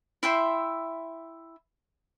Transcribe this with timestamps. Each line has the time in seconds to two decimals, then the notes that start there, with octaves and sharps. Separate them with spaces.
0.23 E4 E5 G5 C6